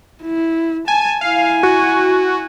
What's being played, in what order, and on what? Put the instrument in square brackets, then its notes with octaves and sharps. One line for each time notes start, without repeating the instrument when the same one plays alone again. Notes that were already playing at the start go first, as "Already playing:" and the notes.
[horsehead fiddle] E4
[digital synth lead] G#5 [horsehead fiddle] A5
[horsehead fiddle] E4 G#5 [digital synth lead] F5
[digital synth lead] F#4